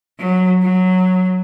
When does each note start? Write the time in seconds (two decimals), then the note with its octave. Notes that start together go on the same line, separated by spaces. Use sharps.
0.18 F#3
0.62 F#3